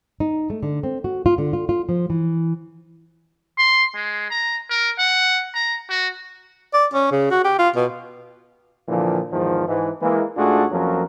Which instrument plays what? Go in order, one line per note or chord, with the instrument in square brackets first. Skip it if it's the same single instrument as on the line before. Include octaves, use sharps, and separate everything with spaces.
[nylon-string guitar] D#4
A3
D3
C4
F#4
F4
D3
F4
F4
F3
E3
[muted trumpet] C6
G#3
A#5
A#4
F#5
A#5
F#4
[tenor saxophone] D5
C#4
C#3
F#4
G4
F4
B2
[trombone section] A#2 D3 E3 F3
E2 G#2 D#3 F3
G#2 E3
E3 G#3 A#3
G#2 A3 D4 F4 F#4 G#4
F2 F3 F#3 A#3 C#4 A#4